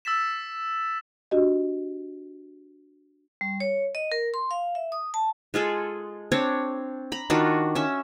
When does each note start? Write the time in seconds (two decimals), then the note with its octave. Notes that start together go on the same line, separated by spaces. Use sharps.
0.05 E6 A6 B6 E7
1.31 D4 F#4 G4 D#5
3.41 G3
3.60 C#5
3.95 D#5
4.12 A#4
4.34 C6
4.51 F5
4.75 E5
4.92 D#6
5.14 A5
5.54 G#3 F4 G#4 A4
6.32 C4 D4 C#5
7.12 A#5 B5
7.30 D#3 D4 F4 F#4
7.75 C#4 E5